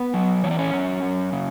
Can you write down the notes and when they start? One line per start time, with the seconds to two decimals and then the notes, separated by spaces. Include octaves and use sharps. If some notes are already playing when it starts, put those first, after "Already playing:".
Already playing: B3 B4
0.14 F#3
0.43 E3 C#5
0.51 D5
0.59 C#4 C#5
0.73 F#2
1.02 F#2
1.32 C#3